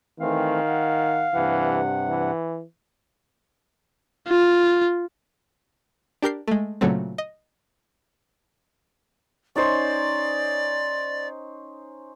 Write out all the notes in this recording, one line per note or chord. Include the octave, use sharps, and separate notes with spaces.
D#3 E3 A3 C4 F5
F#5
G2 C3 E3 F#5
E3
F4
D4 G4 A#4 G6 C7
G#3 A3
A#2 C#3 F#3 A3 C4
D#5
C#4 D#4 C5 D5